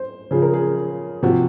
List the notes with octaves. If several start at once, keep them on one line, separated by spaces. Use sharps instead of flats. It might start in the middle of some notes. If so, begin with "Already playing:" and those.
Already playing: C5
C#3 F3 G#4
A#4
G#4
C3 F3 F#4